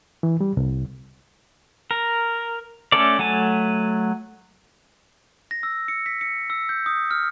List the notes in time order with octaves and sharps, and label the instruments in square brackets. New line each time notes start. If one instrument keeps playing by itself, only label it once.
[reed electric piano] E3
G3
C2
[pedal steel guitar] A#4
A3 C#4 A4 D5
F#3 A3 G#5 A5
[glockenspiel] A#6
E6
C#7
B6
C#7
E6
G6
D#6
F6